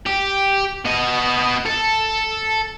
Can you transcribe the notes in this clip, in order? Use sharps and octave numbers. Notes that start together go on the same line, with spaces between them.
G4
B3 D#5
A4